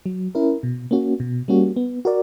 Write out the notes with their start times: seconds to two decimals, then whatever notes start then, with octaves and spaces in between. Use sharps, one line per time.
0.06 F#3
0.35 C#4 E4 A#4
0.63 B2
0.91 A#3 C#4 F#4
1.20 B2
1.48 G3 A#3 C#4 F#4
1.76 B3
2.05 F#4 A#4 D5